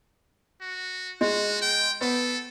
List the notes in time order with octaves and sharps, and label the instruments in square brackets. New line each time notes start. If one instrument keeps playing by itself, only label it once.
[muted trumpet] F#4
[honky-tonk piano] G#3 [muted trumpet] F#4
[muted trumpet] G5
[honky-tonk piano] B3 [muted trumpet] A4